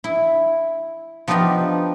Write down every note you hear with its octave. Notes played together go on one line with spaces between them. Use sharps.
E4
F3 B3 D4 D#4 F4 G4